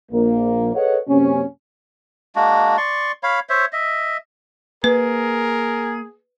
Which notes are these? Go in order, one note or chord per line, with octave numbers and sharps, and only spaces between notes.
A#1 A#3
G#4 A4 B4 C#5 D#5 F#5
F#2 C3 A#3 C#4
G#3 A#3 D4 F#4
D5 C6 C#6
C#5 F5 B5
C5 C#5 E5
D#5 E5
A#3 G#4 A#4 B4